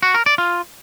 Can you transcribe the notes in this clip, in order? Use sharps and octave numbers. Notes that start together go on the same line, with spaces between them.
F#4
A#4
D5
F4